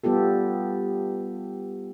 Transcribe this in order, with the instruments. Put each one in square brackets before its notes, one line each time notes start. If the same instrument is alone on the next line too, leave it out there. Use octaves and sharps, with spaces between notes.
[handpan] G3 B3 F4 G4 A4